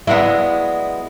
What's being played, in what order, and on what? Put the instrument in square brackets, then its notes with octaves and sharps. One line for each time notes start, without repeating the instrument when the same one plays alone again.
[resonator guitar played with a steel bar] F#3 G#3 B3 [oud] E4 [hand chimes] D5